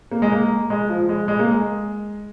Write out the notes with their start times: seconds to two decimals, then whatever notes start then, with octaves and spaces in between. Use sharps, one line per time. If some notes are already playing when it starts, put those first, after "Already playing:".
0.12 A#3
0.22 G#3
0.32 A#3
0.70 G#3
0.89 F3
1.09 G#3
1.28 G#3
1.39 A#3
1.51 G#3